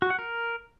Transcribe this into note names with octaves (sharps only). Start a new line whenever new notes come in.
F#4
F#5
A#4